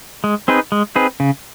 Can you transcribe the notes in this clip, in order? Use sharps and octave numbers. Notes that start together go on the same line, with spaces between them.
G#3
C4 D#4 G#4 B4
G#3
C4 D#4 G#4 B4
C#3